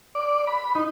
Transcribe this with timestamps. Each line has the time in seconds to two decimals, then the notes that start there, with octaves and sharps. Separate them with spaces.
0.15 D5
0.47 B5
0.75 D#4